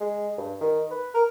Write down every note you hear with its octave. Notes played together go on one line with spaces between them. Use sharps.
G#3
G2
D#3
B4
A#4